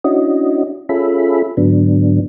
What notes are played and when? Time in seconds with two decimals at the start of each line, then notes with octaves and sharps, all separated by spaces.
0.04 C#4 D4 E4 F#4 D#5
0.89 C#4 F4 G#4 A4 E5 B5
1.57 G#2 D3 F#3 B3 D4